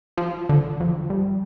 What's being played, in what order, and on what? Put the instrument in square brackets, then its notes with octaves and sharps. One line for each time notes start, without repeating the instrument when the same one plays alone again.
[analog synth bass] F3
D3
F2
G2